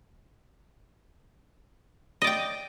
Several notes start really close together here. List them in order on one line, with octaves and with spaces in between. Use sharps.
D#5 D5 G5